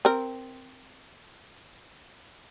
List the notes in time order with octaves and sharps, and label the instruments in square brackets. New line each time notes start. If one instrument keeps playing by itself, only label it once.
[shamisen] C4 A#4